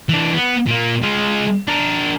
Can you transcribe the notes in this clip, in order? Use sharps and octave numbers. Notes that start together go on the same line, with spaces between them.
E3 D4
B3
A#2 A#3
G#3 F4
D4 A#4